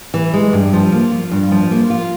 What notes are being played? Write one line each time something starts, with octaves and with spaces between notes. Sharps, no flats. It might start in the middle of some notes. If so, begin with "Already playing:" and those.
E3
G#3
G2
F3
A#3
F4
G2
F3
A#3
F4